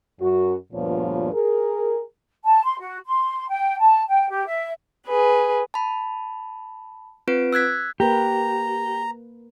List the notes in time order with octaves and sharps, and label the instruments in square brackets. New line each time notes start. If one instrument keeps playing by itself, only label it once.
[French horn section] F#2 F#4
D2 G2 A#2 F3 B3 C#5
G#4 A#4
[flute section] A5
C6
F#4
C6
G5
A5
G5
G4
E5
[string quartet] G#4 B4
[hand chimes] A5 B5
C4 F4 B4 D7
E6 F#6 G#6 B6
[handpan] A#3 A#4 B4 [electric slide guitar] G4 [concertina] A#5